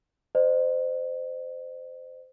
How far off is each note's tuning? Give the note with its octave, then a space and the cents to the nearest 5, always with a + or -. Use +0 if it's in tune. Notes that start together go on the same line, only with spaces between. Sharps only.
C5 -15 D#5 -40